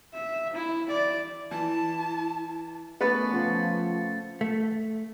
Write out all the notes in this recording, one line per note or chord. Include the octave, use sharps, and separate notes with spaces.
E5
E4
D5
E3 E4 A5
A3 B3 C#4 B4 D5 A6 C#7
C#3 F3 C5 F#5
A3